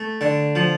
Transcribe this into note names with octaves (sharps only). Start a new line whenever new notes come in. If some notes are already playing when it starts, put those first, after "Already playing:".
Already playing: A3
D3
F3